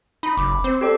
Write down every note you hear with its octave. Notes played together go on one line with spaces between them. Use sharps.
D#4 B5
F#1 D6
C4 C5
G4 A4 D5